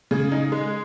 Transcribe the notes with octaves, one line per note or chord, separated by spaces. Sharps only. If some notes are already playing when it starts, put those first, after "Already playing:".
C#3 G#4
D#4
G#3